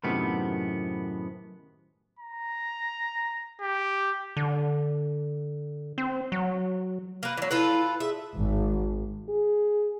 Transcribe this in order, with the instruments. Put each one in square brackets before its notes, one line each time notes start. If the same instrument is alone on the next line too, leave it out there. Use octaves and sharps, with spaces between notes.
[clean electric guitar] F#2 A2 C3 D#3 B3
[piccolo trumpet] A#5
G4
[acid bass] D3
C4
F#3
[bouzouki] A#3 B4
E3 F#3
[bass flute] E4 [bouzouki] F4 A4 B4
[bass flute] G#4 [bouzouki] E5
[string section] G#1
[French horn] G#4